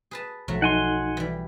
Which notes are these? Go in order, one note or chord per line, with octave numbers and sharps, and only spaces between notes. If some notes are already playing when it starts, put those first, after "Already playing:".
G#4 B4 A5
B1 F3 F#3 A3
D#4 F#5 G#5 C6
E3 G3